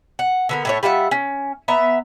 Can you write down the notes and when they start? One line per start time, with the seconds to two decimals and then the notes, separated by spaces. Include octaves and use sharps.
0.19 F#5
0.49 D3 B3 A#4
0.65 A2 A3 C#5
0.83 G3 F4 E5 F#5
1.11 C#4
1.68 B3 E5 A#5